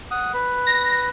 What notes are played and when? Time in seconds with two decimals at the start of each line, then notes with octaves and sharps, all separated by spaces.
0.11 F#5 D#6
0.34 B4
0.67 A#6